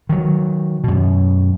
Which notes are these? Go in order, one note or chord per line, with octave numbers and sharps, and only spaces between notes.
D#3 F#3
F#2 B2